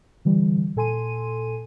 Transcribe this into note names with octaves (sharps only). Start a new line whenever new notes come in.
D3 E3 G3
A#2 A4 G#5 C6 D#7